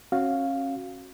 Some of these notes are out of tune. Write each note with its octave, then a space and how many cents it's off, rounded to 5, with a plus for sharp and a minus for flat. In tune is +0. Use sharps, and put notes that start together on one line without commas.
C#4 -30 F#4 -5 F5 +0